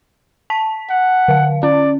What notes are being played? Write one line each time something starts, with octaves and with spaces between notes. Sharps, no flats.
A5 B6
F#5
D3 F5
C#4 D5